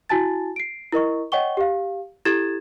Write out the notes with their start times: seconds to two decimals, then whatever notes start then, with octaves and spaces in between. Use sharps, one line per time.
0.09 E4 F#4 G#5 A5 A6
0.56 C7 D7
0.92 E4 A#4 D#5 C#6
1.32 C#5 D#5 F#5 G5 C#6 G7
1.57 G4 F5
2.25 E4 G4 A4 G#6 A6 E7